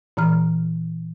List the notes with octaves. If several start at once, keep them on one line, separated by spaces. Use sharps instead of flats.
A#2 E3 A#5 F6